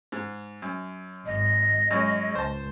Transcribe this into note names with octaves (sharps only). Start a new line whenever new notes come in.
G#2
F#2
G#1 D#5
F#2 G#3 C#4
C#2 C5 A5